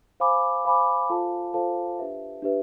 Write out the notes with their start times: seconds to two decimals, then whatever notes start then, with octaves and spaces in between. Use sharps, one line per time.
0.20 C5 F5 G#5 B5 D6
0.65 C5 F5 G#5 B5 D6
1.09 F4 A4 C5 F5 A5
1.54 F4 A4 C5 F5 A5
1.99 D4 G4 B4 E5
2.42 D4 G4 B4 E5